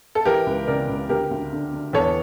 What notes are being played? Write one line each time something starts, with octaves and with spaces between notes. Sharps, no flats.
A4
E3 G4 A#4
C#2
C#3 A#4 D5
C#2
D2 G4 A#4
D2
D3
D3
E2 A4 C#5